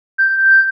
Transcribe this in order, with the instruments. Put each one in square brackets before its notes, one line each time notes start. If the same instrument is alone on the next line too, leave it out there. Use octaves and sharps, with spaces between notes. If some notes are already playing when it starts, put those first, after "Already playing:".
[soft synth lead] G6